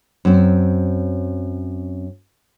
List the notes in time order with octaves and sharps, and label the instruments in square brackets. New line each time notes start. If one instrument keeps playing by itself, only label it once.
[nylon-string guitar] F#2 C4